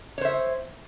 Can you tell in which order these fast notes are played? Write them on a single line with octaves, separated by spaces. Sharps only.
C#5 C5 E5